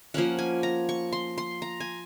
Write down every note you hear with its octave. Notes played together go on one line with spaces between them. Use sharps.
F3 A#3 C#4 F#5
G#5
A#5
C#6
C6
C6
A#5
G#5